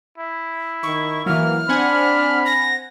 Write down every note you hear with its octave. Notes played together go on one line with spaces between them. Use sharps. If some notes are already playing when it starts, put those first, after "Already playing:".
E4
D#3 C#6
E3 F#3 A#3 F6
C4 D4 F#5 G#5 B5
A#6